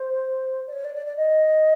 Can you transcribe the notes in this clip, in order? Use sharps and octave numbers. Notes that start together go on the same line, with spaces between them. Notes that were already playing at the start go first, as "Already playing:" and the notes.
Already playing: C5
D5
C#5
D5
D5
D5
D#5